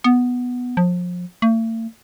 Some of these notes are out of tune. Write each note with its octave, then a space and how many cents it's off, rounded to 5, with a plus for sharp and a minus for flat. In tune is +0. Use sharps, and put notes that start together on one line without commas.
B3 +0
F3 +30
A3 +45